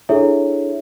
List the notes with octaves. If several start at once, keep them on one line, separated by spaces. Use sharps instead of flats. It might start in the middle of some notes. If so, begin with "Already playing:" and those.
D4 E4 G#4 A4 C#5 E5